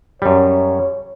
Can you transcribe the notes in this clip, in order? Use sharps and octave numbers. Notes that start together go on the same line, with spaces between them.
F#2 G3 C#5